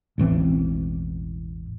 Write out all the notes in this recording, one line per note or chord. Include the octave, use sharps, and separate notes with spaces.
E1 A1 E3 C4